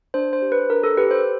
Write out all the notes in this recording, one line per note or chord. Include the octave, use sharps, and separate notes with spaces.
D4 C5
C5
G4
B4
D4 A#4
A4
G4 B4
C5